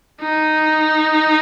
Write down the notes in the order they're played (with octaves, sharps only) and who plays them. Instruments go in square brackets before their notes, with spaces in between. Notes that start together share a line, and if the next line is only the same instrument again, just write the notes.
[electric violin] D#4